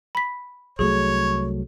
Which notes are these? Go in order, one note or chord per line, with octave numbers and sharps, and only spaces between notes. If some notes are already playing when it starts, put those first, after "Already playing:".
B5 B6
C2 F#3 A3 G#4 C#5